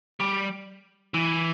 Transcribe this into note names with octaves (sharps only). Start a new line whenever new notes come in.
G3
E3